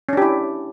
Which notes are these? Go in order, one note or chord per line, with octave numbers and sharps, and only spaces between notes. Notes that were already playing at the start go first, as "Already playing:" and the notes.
C#4 D4 E4 G4